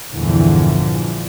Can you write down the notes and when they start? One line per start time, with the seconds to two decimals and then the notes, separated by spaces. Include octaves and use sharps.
0.10 A#1 E2 G2 D3 E3 F3